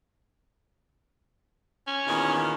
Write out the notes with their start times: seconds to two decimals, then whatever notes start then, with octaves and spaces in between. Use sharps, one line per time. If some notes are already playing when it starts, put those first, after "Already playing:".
1.87 C#4
2.07 E2 A#2 D#3